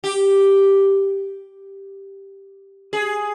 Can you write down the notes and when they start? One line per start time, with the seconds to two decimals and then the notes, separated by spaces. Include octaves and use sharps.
0.04 G4
2.93 G#4